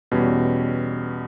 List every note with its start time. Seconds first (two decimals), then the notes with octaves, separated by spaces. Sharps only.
0.11 E2 B2 G3 C#4